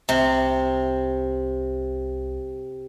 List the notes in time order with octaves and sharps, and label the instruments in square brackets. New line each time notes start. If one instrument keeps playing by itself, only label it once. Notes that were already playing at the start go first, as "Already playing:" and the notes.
[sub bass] C2 [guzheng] C3